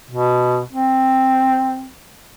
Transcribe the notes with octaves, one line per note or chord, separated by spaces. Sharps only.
B2
C4